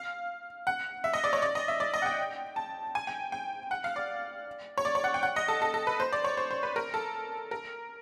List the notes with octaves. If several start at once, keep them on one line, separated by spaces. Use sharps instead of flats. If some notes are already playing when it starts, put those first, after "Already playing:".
Already playing: F5
F#5
E5
D#5
D5
C#5
D5
D#5
E5
D5
D#5
F#5
G5
A5
G#5
G5
G5
F#5
F5
D5
C#5
D5
C#5
F#5
G5
F#5
D#5
A4
A4
A4
B4
C5
D5
C#5
C5
C5
B4
A#4
A4
A#4